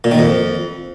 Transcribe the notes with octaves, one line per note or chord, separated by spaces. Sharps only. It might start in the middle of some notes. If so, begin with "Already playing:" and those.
A#2
D#3
F2